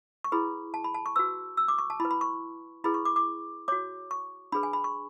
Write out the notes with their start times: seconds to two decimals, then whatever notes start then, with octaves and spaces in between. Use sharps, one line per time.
0.24 C#6
0.32 E4 G#4 B4 B5
0.74 A5
0.84 B5
0.94 A5
1.06 C#6
1.16 F#4 B4 E6
1.57 E6
1.68 D6
1.78 C#6
1.90 A5
2.00 E4 B5
2.05 B4
2.11 B5
2.21 C#6
2.84 E4 G#4 B4 B5
2.94 C#6
3.05 D6
3.16 D6
3.68 F#4 C#5 D6
4.11 C#6
4.52 D4 G#4 B4 B5
4.63 G#5
4.73 B5
4.84 C#6